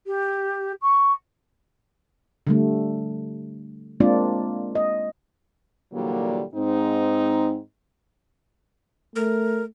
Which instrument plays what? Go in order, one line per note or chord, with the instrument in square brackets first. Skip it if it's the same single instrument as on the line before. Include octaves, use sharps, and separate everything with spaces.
[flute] G4
C#6
[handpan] D3 G3 A3
G#3 A#3 C4 D4 F4 D5
D#5
[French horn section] A#2 D3 E3 F#3 G3 A#3
G#2 C4 D#4
[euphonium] A3 [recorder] A#4